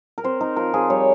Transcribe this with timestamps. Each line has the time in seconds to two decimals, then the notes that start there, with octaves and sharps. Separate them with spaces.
0.18 A#4
0.24 C4 C5
0.41 D#4 A#4
0.56 F3 A#4
0.74 F3 G#4
0.90 G3 C#5